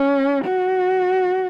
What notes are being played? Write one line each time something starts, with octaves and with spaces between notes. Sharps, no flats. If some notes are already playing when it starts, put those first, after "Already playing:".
Already playing: C#4
F#4